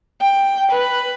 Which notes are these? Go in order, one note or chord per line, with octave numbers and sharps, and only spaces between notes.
G5
B4